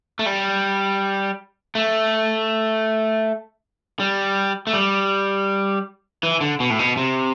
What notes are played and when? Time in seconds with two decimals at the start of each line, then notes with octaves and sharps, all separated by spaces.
0.19 A3
0.26 G3
1.75 A3
4.00 G3
4.67 A3
4.73 G3
6.23 E3
6.41 D3
6.60 B2
6.70 A2
6.79 B2
6.97 C3